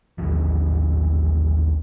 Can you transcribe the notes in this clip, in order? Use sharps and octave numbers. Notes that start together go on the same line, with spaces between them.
A1 D#2 D3 F3